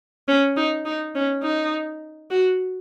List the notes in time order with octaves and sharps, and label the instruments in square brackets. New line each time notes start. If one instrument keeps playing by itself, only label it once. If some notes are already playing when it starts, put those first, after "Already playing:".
[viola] C#4
D#4
D#4
C#4
D#4
F#4